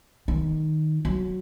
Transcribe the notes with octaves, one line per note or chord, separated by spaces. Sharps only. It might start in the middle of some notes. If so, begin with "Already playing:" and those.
D#3
F#3